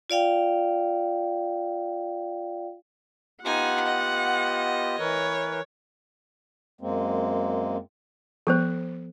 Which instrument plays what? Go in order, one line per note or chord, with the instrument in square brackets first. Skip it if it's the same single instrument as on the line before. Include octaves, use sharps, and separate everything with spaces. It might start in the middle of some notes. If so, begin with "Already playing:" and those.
[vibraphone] F4 D5 F5 G5
[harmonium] B3 F4 G4 [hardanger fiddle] D#4 G#5 [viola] F#5
[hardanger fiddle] D#5
[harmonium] E3 A#4 B4 [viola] C#5
[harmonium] F#2 G#3 A#3 C4
[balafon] F3 B3 [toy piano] A4 C5